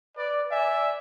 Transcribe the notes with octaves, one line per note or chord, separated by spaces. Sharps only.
B4 D5
D5 E5 G#5